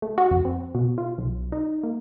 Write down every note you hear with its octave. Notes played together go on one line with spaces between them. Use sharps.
A3
F#4
F2
C4
B2
F4
B1
D#4
A#3